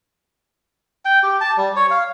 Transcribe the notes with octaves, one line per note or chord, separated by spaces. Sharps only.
G5
G4
A5
G3
C#5
F5